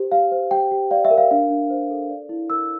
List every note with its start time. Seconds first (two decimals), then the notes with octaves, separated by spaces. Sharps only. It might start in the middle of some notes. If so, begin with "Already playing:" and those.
Already playing: G4 C5
0.12 G4 F5
0.32 C5
0.51 G4 G5
0.71 G4
0.91 D5 F5
1.05 E5
1.11 A#4
1.18 F5
1.31 D4 F5
1.50 D4
1.70 C5
1.90 A4
2.10 D5
2.29 E4
2.50 A#4 E6